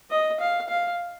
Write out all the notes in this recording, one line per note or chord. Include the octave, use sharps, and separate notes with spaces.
D#5
F5
F5